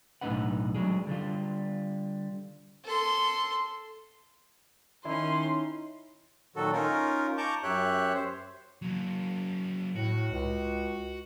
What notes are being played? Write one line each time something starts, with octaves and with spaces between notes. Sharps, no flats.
B1 A2 D4 D#4 B4 F#5
F#3 G#3 D4 G#4
D3 G3 F4
A4 C6
D#3 C#4 D#4 E4 C6
A#2 D#3 F#3 F#4 A4
C#4 D#4 F4 A#4
A5 A#5 C#6 D6 G6
F#2 G4 C#5 E5 F#6
C5
F#3 A#3
A2 F#4
C#2